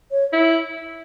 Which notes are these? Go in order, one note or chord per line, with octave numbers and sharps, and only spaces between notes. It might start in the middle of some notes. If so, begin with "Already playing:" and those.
C#5
E4